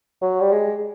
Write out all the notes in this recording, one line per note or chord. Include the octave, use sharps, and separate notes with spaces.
F#3
G3
G#3